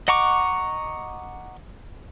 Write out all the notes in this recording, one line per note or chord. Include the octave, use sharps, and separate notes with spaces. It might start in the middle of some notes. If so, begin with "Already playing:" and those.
D#5 F#5 A#5 C#6 D6